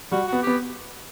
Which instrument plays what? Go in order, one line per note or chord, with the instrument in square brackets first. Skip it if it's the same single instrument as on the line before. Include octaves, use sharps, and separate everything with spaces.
[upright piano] G3 [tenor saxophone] F#4
[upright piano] B3 [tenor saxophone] F#4
[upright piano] B3 [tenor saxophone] G4